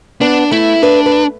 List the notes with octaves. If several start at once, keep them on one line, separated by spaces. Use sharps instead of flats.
B3 D4
A3 E4
D4 B4
B4